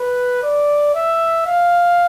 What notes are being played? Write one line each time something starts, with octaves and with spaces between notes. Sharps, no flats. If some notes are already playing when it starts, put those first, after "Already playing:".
Already playing: B4
D5
E5
F5